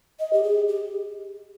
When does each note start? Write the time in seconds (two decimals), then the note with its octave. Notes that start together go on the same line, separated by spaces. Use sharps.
0.19 D#5
0.33 G4
0.44 G#4
0.68 G4